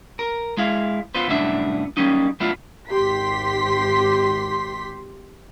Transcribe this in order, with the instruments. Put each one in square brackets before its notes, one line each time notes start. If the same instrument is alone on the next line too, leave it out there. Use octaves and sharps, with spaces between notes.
[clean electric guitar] A#4
G#3 E4 F5
B3 F4 B4 C5
C2 F#2 A2 B3 D4 E5
F#3 G3 A#3 C#4 D#4
F#3 A3 B3 D4 E4 F4
[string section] G#1 G4 C6 B6